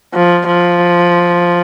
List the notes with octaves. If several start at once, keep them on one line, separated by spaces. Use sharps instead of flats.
F3
F3